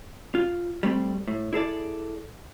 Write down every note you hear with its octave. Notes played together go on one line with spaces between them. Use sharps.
F4
G3 A3 C4
A2
E4 G#4 A4 D5